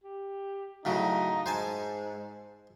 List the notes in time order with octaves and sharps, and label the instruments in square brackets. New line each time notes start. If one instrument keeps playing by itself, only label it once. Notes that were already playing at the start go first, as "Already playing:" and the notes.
[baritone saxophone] G4
[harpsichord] A2 C#3 F#3 [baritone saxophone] D#4
[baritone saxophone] G#2 [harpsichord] C5 G#5 A5